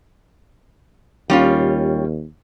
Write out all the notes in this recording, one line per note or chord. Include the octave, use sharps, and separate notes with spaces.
D#2 G3 C#4 F4